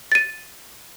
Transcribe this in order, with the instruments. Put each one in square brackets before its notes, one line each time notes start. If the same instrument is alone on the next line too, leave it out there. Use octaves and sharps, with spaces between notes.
[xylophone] A6 D#7